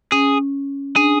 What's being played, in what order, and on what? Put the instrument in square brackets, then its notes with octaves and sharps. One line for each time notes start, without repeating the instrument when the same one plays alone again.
[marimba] C#4 [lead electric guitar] G#4
[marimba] D4 [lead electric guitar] G#4